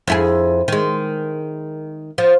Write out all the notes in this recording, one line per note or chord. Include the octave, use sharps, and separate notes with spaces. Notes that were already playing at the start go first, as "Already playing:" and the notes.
F2 E4 G#4
D#3 G#3
F3